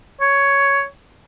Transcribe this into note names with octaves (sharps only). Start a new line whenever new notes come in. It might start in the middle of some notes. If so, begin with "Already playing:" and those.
C#5